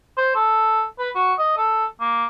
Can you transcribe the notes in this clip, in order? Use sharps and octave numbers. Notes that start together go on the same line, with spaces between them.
C5
A4
B4
F#4
D#5
A4
A#3